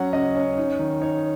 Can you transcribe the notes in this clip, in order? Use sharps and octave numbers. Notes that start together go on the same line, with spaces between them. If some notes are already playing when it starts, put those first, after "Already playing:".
Already playing: F#3 C#4 F#5
C#3 D#5
C#4
D#4
D#3
D#4 C#5